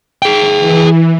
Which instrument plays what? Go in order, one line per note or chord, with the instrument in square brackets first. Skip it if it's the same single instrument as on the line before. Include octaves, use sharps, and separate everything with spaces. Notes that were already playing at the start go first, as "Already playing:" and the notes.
[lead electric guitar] G#4 G5
[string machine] E3